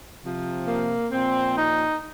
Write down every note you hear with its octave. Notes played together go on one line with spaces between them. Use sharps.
C3 F3
A#3
A#2 F3 C4
D#4